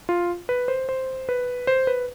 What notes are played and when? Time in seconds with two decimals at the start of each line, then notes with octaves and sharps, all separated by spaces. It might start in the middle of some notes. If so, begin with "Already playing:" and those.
0.09 F4
0.49 B4
0.68 C5
0.89 C5
1.29 B4
1.67 C5
1.87 B4